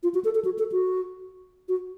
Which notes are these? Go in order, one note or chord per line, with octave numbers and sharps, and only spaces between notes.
F4
F#4
A4
A4
F#4
A4
F#4
F#4